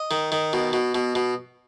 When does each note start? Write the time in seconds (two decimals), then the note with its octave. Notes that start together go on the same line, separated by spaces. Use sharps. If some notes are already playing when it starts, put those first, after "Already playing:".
Already playing: D#5
0.11 D#3
0.32 D#3
0.53 B2
0.73 B2
0.95 B2
1.15 B2